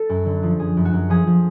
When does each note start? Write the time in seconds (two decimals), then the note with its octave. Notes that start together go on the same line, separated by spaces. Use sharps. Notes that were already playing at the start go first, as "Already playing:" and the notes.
Already playing: A4
0.09 F#2
0.25 D3
0.43 F3
0.59 F#2 G#4
0.77 F#2
0.85 F#4
0.93 F#2
1.09 F3 G#4
1.27 F3